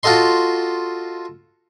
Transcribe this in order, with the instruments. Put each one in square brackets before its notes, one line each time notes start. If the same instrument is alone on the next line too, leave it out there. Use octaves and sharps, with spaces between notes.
[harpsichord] F4 F#4 A4 D#5 C6